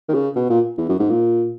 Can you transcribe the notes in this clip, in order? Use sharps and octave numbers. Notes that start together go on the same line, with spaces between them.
D#3
C#3
B2
A#2
E2
F#2
G#2
A#2